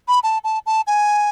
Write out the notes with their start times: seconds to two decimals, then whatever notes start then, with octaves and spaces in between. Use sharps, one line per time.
0.08 B5
0.23 A5
0.44 A5
0.66 A5
0.87 G#5